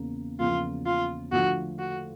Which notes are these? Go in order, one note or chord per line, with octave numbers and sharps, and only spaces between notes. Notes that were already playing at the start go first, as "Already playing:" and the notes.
Already playing: E2 C#3 A#3
E2 C#3 F3 A#3 F4
F4
D3 F3 A3 F#4
F#4